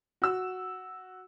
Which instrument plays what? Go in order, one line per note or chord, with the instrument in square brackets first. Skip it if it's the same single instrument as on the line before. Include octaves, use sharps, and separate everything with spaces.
[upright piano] F#4 E6